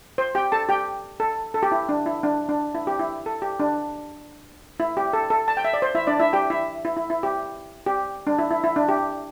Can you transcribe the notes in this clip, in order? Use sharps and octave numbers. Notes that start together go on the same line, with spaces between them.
C5
G4 G5
A4 A5
G4 G5
A4
A4
G4
E4
D4
E4
D4
D4
E4
G4
E4
A4
G4
D4
E4
G4
A4
A4
A5
G5
E5
D5
C5
E4 E5
D4 D5
E4 E5
G4 G5
E4 E5
E4
E4
E4
G4
G4
D4
E4
E4
E4
D4
G4